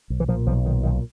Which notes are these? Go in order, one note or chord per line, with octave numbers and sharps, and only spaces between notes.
B1
E3
A#2 F3
B1 F3
A#2 D#3
B1 D#3